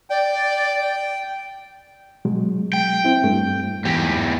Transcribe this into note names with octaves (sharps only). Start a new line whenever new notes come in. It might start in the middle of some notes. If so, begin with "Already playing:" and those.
D5 G5
B2 F#3 G#3
G5
C4 E4
G2 A3
E2 G4